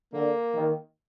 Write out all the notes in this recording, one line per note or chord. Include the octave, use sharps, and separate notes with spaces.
D3 A#3
D#3